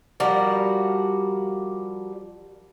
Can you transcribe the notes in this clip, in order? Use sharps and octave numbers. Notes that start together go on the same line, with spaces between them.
F3 G3 F#4 A#4